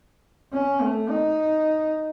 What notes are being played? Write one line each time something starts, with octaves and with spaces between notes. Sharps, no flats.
C#4
A3
D#4